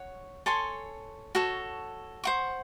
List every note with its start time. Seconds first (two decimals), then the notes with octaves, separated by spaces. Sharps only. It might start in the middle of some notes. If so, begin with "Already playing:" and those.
Already playing: C#5 F#5
0.46 A4 C#5 G#5 C6
1.35 F#4 A4 C#5
2.24 C5 F#5 C#6